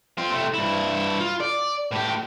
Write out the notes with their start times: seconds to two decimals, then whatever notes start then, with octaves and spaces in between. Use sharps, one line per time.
0.18 C4 F4
0.31 C3 A3
0.54 G2 E4
1.20 F4
1.40 D5
1.91 A2 G4